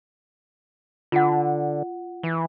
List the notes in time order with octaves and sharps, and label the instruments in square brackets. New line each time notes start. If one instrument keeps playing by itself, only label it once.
[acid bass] D3 [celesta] F4 F#5
[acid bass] E3